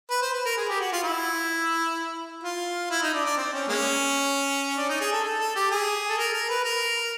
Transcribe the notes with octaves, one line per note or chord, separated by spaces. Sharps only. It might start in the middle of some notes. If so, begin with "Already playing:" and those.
B4
C5
B4
A#4
G#4
G4
F#4
F4
E4
F4
E4
D#4
D4
D4
C4
C#4
G#3 A#3 C#4
D4
D#4
G#4
A4
A4
A4
G4
G#4
A4
A#4
A#4
B4
A#4